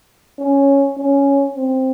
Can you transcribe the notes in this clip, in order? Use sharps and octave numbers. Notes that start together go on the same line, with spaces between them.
C#4
C#4
C4